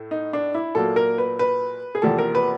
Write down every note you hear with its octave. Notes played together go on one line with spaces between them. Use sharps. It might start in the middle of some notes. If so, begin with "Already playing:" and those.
Already playing: A2 A3
D#4
D4
E4
A#2 F#3 A#3 A4
A#4
B4
B4
G#4
E2 C3 F3 A#3 A4
A#4
B4